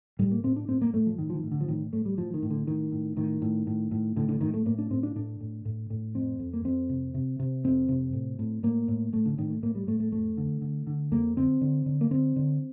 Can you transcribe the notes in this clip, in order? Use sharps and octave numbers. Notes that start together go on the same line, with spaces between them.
A2 G3
A#3
A2 C4
D4
A2 C4
A#3
A2 A3
F3
A2 D#3
F3
D#3
A2
D3
F3
A2 D#3
A2 A3
G3
A2 F3
D#3
A2
D3
A2 D#3
A2
A2 D#3
A2
A2
A2
A2 D3
D3
A2 D#3
A3
A2 A#3
D4
A2 C4
D4
A2 D4
A2
A2
A2
F2 C4
F2
A#3
F2 C4
C3
C3
C3
F2 C4
C3
A2
A2
A2 A#3
A2
A2 A3
D3
A2 D#3
A3
A2 A#3
G3
A2 A3
A3
F2 A3
D3
D3
D3
F2 A#3
D3 C4
D3
D3
A#3
D3 C4
D3